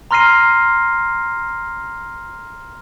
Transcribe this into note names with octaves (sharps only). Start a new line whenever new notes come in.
A#5 C6 F6 A#6 C7 D#7